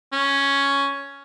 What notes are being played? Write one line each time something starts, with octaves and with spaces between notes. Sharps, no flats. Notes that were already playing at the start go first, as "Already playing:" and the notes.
C#4